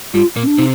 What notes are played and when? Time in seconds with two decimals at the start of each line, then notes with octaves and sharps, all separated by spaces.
0.14 G2 G3 F4
0.36 A#2 A#3
0.43 C4
0.47 D4
0.58 C3 C4 D#4